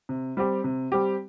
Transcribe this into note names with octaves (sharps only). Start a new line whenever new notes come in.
C3
G3 C4 G4
C3
G3 C4 G4